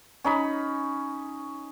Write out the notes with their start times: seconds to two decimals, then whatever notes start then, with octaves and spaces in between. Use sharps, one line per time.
0.24 C#4 D#4 B5